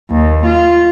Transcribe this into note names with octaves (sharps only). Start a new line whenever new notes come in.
D#2
F4